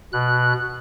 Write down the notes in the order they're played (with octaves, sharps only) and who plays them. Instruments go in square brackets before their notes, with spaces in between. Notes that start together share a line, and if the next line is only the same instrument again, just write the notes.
[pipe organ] B2 F#6